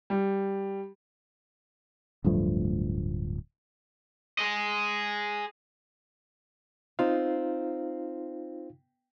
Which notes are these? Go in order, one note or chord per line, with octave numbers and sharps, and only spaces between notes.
G3
D1 G2 F3 A3
G#4 D#5
C4 D#4 F4 F5